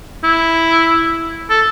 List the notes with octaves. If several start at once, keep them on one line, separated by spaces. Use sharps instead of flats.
E4
A4